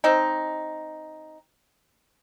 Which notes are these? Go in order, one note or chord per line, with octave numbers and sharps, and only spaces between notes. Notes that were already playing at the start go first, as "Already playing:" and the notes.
C4 D#4